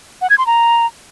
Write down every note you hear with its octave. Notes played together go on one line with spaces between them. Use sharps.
F#5
G#6
C6
A#5